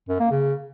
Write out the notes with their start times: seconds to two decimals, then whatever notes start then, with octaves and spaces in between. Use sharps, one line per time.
0.09 F#2
0.20 A#3
0.31 C#3